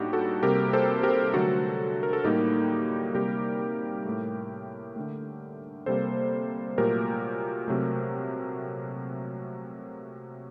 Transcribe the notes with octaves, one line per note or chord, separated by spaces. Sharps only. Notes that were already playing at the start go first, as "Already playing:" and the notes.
Already playing: A2 G3 A#3 D4 D#4 F#4 G4
F#4 A4
C3 G3 A#3 G4 A#4
A4 C5
G4 A#4
D3 F#3 A3 F#4 A4
A#4
A4
A2 G3 A#3 D#4 G4
C3 G3 A#3 G4 A#4
A2 A3
D3 A3
C3 G3 A#3 A4 C5
A#2 F#3 A3 G4 A#4
C3 F#3 A3